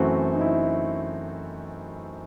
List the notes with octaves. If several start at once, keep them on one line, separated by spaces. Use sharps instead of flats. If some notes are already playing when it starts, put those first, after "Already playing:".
Already playing: F#2 E3 A3 C4 F#4
D#4
E4